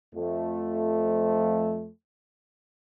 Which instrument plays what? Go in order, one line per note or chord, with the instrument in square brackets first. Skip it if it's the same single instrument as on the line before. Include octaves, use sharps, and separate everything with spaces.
[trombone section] F2 F3 A3